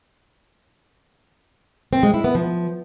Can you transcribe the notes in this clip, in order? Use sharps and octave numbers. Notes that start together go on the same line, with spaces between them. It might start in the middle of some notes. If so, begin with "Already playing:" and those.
C4
G#3
E4
B3
F3